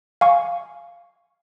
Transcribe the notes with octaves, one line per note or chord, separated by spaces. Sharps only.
F5 G#5 C#6